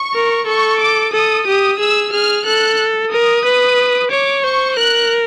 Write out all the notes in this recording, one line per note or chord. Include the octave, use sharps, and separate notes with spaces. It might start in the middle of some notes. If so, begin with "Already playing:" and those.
Already playing: C#6
A#4
A4 C#6
D6
A4 D#6
G4 D#6
G#4 E6
G#4 F6
A4 F#6
A#4 D#6
B4
C#5 D6
C5 C#6
A#4 F#6